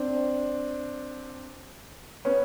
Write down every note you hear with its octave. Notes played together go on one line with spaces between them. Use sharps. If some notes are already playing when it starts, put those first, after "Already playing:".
Already playing: C4 D4
B3 C#4